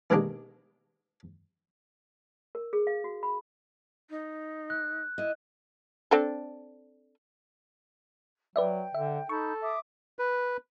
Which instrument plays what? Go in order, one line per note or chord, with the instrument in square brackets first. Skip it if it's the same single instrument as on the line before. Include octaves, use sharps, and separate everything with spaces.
[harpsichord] B2 D#3 G#3 A#3 D4 G4
[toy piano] A#4
G#4
F5
F#4
B5
[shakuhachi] D#4
[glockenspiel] F#6
[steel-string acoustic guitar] E4 D#5
[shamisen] C4 D4 A4
[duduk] F#3 [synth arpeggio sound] B4 D5 E5 [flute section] G5
[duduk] D3 [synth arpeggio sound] E5
[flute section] D#4 B5 G6 [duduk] A4 [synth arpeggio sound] C#6
[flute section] E5 D6 D#6
[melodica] B4